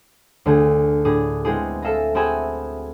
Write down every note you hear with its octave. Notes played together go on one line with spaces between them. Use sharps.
D2 D3 A3 G#4 G#5
A2 D4 G#4
G#3 B3 C4 E4 G#4
A4 E5 F5 G#5 A#5
C4 F#4 G#4 E5 G#5 B5